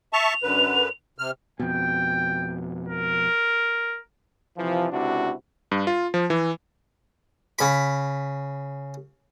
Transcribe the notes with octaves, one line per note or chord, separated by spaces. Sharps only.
E5 A5 C#6 F7
F#2 D3 B4
C3 F6
F2 B2 G5
A#4
C3 E3 F3
C#2 C3 D4 E4 F#4
G2
F4
F3
E3
C#3 B5